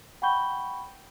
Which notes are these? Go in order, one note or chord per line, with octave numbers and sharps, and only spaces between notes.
F#5 G5 B5 C#6 G6 G7